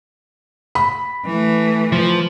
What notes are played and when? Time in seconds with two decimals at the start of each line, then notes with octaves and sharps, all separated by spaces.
0.75 B5
1.25 E3 A3
1.92 F3